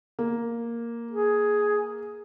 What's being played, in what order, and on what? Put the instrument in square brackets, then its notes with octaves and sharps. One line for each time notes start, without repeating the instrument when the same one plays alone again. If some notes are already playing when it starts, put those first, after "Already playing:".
[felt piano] A#3
[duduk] G#4